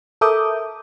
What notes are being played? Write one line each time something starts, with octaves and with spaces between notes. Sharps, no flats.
A4 A#4 E5 D6 D#6 G6